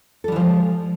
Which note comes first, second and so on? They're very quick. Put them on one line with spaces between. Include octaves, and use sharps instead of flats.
A4 G3 E3 F3 G#3